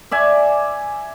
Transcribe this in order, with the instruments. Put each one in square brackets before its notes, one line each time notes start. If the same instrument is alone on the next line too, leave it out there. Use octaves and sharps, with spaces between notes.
[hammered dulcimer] D5 E5 G#5